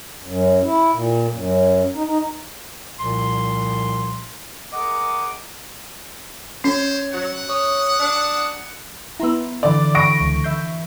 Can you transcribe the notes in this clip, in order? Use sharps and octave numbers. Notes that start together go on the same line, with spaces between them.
F#2
E4
A#2
F#2
D#4
D#4
C2 A#2 F3 C6
G#4 A#4 D#5 F#5 D6
C#4 C5 C#5
F#3 F#5
C#5 D#6
D4
B3 E4 A#5 C6 E6
D3 E3 D4 D5
B5 C#6 A#6 D7
C#2
E3 E5 G6 C7